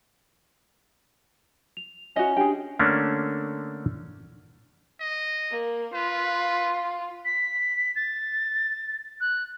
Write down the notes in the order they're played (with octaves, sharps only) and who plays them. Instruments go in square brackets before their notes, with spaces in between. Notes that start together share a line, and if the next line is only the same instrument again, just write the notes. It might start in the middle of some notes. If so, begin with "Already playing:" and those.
[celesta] F7
[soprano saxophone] C#4 [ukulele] F#4 D#5
[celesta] D4 G4 G#5 [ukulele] G#4 G5
[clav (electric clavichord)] D3 A3 A#3 C#4 D4
[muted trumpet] D#5
[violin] A#3
[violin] F4 [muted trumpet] B4
[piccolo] B6
A6
F#6